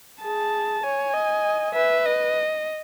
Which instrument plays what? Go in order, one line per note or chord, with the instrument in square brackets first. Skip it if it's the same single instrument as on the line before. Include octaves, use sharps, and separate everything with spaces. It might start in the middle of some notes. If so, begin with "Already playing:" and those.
[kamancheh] G#4 [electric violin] A5
[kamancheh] C#5 [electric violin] G#5
[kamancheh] D#5
[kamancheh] B4 [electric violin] E5
[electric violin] D#5